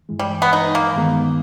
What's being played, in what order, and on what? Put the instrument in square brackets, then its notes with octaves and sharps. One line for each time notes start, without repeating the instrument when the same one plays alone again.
[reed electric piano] G2 E3 G#3
[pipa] G3
B3
D#4
A#3
[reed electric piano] G2 D#3 G#3 B3